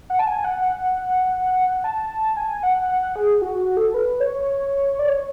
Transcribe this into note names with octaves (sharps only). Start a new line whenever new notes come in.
F#5
A5
G#5
F#5
F#5
A5
G#5
F#5
F#5
G#4
F#4
F#4
A4
B4
C#5
D5
C#5